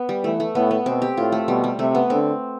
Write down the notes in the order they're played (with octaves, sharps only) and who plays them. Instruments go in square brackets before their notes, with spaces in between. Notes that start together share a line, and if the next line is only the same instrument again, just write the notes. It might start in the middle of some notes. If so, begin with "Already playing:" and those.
Already playing: [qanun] B3
G3
[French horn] E3 [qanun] A3
[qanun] A3
[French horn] A2 [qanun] B3
[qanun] B3
[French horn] B2 [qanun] C4
[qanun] G4
[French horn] A2 [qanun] F4
[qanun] A3
[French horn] B2 [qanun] G3
[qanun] G3
[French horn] C3 [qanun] A3
[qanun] B3
[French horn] D3 [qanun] C4